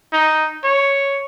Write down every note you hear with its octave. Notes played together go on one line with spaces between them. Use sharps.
D#4
C#5